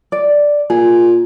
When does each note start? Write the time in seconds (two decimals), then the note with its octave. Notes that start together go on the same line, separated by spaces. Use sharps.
0.12 D5
0.70 A#2 G#4